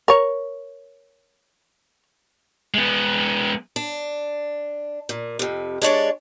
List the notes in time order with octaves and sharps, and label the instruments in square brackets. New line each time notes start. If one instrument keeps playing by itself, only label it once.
[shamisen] A#4 C#5
[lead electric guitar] G#3 B3
[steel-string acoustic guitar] D4
A#2
F2 C3
G#3 D4 C#5 D5